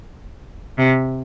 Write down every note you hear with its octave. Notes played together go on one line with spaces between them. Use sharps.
C3